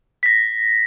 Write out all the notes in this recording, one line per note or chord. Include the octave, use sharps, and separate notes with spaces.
A#6 B6